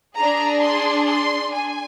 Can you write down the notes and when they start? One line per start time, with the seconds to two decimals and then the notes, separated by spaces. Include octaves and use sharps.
0.16 D4 G#4 A#5
0.61 C6
1.08 C6
1.53 G#5